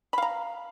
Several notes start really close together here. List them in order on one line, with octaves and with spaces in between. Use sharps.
B5 F5 A#5